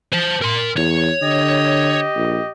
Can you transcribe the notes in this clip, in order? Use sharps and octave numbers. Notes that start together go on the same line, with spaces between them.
C5 A5
A#4 C6
E2 C#5
D3 G4 D#5
A#1